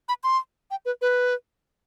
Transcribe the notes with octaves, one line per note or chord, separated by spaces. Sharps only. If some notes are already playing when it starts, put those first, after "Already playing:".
B5
C6
G5
B4
B4